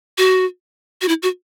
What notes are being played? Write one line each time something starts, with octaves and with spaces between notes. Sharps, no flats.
F#4
F#4
E4
F#4